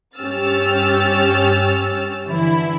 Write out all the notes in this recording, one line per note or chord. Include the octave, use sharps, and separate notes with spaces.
G2 C#4 G4 E6 F6 A6
D3 E3 E4